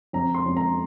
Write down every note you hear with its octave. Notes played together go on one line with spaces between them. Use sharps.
F2 A#5
C6
F2
A#5